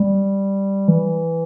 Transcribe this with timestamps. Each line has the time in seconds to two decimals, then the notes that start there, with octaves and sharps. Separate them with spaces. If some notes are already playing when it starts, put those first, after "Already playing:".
Already playing: G3
0.88 E3